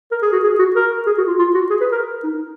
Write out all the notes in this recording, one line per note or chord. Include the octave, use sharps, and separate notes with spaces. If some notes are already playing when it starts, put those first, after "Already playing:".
A#4
G#4
F#4
G#4
F#4
A#4
G#4
F#4
F4
F4
F#4
G#4
B4
A#4
D#4
D#4